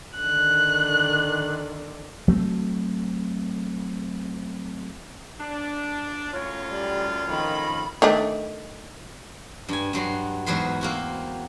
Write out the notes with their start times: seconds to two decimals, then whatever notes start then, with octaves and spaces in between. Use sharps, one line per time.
0.19 D3 D#3 F#6
2.28 F#3 A3 C4
5.40 D4
6.33 F#2 A2 F4 C#5
6.71 G3 D5
7.28 F2 D#3 B5
8.02 D#3 A3 D4
9.68 G2 G#5
9.93 G2 F#3 C6
10.46 E2 G#2 F#3 G#4 B4 C6
10.81 A#3 C4 F#4